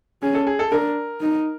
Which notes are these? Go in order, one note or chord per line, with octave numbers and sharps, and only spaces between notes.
C#4 G#4
A4
G#4
A4
D4 A#4
D#4